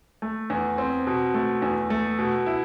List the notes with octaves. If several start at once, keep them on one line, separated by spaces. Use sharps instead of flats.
A3
E2
C4
B2
A3
E2
A3
B2
E4